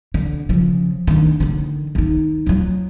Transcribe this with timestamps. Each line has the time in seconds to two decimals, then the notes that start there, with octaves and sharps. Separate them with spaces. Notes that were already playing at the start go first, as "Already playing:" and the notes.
0.14 D3
0.49 C#3 F3
1.07 D#3 D4
1.40 D3 D#3
1.95 D#3 D#4
2.46 F3 F#3